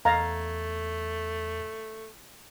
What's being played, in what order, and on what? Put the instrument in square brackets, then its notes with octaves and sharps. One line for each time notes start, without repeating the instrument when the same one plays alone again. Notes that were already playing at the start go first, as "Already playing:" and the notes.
[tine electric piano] E2 G#6 A6 [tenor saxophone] A3 [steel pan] D#5 F5 A#5